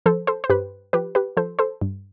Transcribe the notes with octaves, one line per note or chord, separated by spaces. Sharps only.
F3 A4 C5
A4 C5
C5
G2 G4 B4
F3 G4 B4
G4 B4
F3 A4 C5
A4 C5
G2